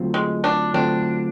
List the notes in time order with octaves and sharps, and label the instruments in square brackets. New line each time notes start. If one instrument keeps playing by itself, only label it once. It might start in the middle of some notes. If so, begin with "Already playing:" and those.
Already playing: [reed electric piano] D3 F#3 A3 C4 F4
[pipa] G#3
D4
[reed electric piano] D3 F#3 A3 C4 F4 [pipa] D4